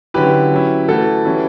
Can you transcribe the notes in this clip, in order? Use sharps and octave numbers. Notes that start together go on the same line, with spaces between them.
D3 F#3 C#4 E4 G4 B4
F#3 C#4 E4
E3 A3 E4 F#4 A4
E3 G3 C#4 E4